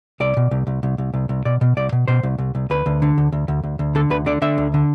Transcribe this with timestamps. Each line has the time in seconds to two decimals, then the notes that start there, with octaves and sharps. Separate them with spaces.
0.20 C2 D5
0.37 B2
0.51 C2
0.67 C2
0.83 C2
0.98 C2
1.14 C2
1.29 C2
1.45 B2 D5
1.61 B2
1.77 C2 D5
1.92 B2
2.08 B2 C5
2.23 C2
2.38 C2
2.55 C2
2.70 D2 B4
2.86 D2
3.02 D3
3.18 D2
3.32 D2
3.48 D2
3.63 D2
3.79 D2
3.95 D3 A4
4.10 D2 B4
4.26 D3 D5
4.42 D3 E5
4.58 D2
4.74 D3